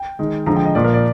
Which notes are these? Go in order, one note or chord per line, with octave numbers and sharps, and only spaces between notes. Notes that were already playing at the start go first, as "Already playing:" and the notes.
Already playing: G5
D#3 G#3
D3 F3 G#3 A#5
G5
D#5
A#2 F3 A#3 D5
A#4
D5